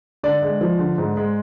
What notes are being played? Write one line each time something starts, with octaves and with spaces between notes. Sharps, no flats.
D3 D5
G#3
F3
D3
G#2
G#3